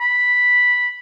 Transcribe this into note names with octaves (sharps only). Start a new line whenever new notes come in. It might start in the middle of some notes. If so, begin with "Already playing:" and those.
B5